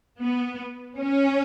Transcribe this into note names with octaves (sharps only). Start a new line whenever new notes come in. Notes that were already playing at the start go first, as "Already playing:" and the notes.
B3
C#4